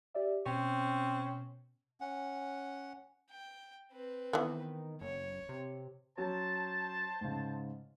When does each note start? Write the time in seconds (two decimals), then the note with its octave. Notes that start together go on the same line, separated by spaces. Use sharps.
0.14 G4 D5 E5
0.46 B2 C4 C#4
2.01 C#4 F#5
3.31 G5
3.92 C4 B4
4.33 D#3 E3 B3
5.01 F#1 C#5
5.49 C3
6.18 F#3 C#4 C5 A5
7.21 G#2 C#3